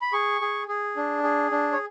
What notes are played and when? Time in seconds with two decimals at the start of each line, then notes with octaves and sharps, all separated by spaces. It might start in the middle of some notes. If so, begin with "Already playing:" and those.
0.01 B5
0.13 G#4 C#6
0.41 G#4
0.68 G#4
0.97 D4
1.23 G#4
1.51 D4
1.72 C#5